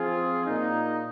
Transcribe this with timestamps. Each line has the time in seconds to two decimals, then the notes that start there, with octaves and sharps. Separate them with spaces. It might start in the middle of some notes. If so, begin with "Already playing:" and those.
Already playing: F3 C4 F4 G#4
0.46 A#2 A#3 D#4